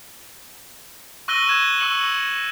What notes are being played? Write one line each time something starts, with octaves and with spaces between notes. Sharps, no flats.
C#6 E6 F#6 A#6 D#7 G7
G#6 E7
C#6 E6 C#7 F#7 G7